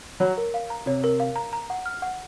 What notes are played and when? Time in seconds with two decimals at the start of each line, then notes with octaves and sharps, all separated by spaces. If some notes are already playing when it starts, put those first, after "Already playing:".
0.20 F#3 C#5
0.38 A#4
0.54 F5
0.70 A#5
0.86 C3 C#5
1.04 A#4
1.20 F5
1.36 A#5
1.53 A#5
1.70 F#5
1.86 F6
2.02 F#5